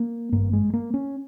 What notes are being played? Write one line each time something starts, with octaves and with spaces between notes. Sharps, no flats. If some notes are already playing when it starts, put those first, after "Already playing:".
Already playing: A#3
G#1 G2 A#3
G#3
A#3
C#4